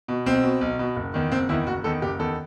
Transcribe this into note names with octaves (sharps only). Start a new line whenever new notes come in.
B2
B1 C4
B2
B1
B2
F#1
E2 D#3
F#1 C4
E2 D#3 E4
F#1 F#4
E2 D#3 A4
F#1 G4
E2 D#3 A4